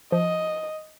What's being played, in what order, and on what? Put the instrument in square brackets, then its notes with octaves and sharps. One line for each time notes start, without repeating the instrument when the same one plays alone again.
[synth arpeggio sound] F3 [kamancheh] D#5